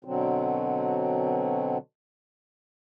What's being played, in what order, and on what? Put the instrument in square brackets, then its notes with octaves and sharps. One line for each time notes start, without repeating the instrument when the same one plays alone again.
[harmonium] B2 D3 F#3 C4